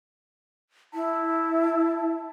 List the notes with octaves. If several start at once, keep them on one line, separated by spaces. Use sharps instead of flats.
E4 A5